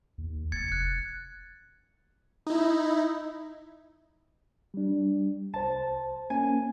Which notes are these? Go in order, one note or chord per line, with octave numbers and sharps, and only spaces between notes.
D#2
F1 G#6 A6 C#7
F#6 C#7
D#4 E4
G3 D4
C2 C5 A5
A#3 C#4 G#5